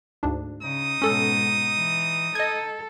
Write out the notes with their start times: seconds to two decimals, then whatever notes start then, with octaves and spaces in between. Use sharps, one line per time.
0.23 D2 G#2 D4
0.63 C#3 D#4 D#6
1.02 G#2 B2 C#4 A4
1.75 E3
2.35 A4 D#5 G#6